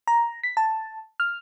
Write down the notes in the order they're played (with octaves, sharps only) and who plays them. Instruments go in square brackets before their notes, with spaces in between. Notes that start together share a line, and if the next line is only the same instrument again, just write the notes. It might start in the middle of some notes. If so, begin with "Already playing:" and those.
[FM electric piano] A#5
B6
A5
F6